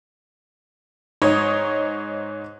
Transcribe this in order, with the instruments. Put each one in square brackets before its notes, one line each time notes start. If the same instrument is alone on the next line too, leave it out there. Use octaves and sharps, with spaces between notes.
[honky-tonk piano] G#2 D#4 C#5 D#6